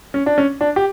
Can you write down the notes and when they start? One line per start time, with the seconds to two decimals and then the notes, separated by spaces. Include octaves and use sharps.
0.14 C#4
0.26 D4
0.38 C#4
0.61 D4
0.76 G4